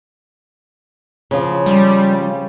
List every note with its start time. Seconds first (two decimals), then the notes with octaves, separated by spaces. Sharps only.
1.31 C#3 F3
1.66 G3